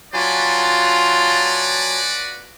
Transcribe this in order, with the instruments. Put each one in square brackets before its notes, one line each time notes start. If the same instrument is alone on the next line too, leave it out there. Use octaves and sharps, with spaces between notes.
[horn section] F#3 G#5 A5 [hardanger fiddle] F4 [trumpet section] F#4 B4 D5